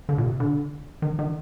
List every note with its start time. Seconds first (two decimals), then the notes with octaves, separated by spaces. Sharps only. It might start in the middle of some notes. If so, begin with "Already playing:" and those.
0.09 D3
0.18 A#2
0.24 C3
0.40 D3
1.02 D#3
1.19 D#3